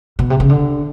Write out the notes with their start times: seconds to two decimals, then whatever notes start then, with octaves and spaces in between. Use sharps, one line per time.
0.19 B2
0.30 C3
0.40 C#3
0.50 D3